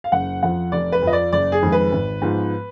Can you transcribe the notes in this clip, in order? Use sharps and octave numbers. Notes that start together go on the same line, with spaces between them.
F5
F#1 F#5
F2 F3 F#5
F1 D5
B4
F2 F3 D#5
D5
F#1 D5
G#4
F2 D#3 G#3
B4
G#1
G#2 F3 B3